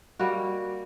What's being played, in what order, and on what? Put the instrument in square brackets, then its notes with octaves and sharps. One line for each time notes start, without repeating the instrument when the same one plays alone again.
[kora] G3 A#3 F#4